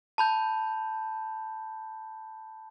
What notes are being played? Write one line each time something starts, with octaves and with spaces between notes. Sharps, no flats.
A5 B5 G6